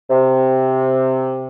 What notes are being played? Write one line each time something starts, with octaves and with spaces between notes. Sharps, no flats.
C3